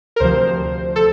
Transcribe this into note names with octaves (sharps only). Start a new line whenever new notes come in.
A#4
D2 C3 F3 C5
A4